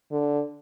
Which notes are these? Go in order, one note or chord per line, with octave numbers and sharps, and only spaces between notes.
D3